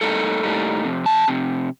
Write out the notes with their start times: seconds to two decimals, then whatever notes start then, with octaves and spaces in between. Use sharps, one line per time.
0.01 A2 G3 A#3 D#4 A4
0.43 A2 G3 A#3 D#4
0.85 F2 C3
1.06 A5
1.28 F2 C3